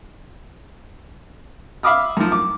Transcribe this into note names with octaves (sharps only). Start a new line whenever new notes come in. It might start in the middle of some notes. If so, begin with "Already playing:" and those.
E5 F5 B5 D6 D#6 F6
F#2 F3
D6